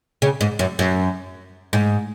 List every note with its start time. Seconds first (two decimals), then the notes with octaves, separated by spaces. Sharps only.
0.22 C#3
0.41 G#2
0.59 F#2
0.79 F#2
1.73 G#2